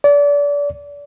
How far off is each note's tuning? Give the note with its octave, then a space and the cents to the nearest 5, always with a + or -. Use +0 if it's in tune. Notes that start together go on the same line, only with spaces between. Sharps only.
D5 -30